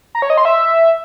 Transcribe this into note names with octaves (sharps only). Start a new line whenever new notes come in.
A#5
C#5
D#5
C6
E5